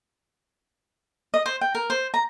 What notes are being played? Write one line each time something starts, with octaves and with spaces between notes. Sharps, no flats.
D#5
C5
G5
A#4
C5
A#5